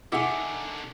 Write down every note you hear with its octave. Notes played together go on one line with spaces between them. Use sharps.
D3 D#3 E4 G#4 E5 F#5 G#5 D6